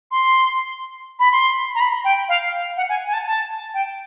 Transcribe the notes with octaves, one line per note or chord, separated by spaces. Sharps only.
C6
B5
C6
A#5
B5
G5
F5
F#5
G#5
G#5
A5
A5
G5